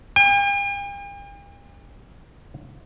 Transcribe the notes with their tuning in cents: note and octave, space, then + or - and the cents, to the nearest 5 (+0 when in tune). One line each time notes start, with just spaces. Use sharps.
G5 +45